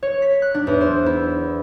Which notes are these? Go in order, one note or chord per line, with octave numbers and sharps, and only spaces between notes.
C#5
B6
F#6
D4
E2
C5
E4